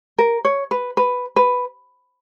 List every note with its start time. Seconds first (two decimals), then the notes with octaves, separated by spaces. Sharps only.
0.18 A#4
0.45 C#5
0.71 B4
0.97 B4
1.36 B4